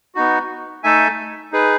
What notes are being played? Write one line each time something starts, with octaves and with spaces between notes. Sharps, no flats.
B3 D#4 F#4
A3 D#4 A4 E5 G#5
D#4 G#4 B4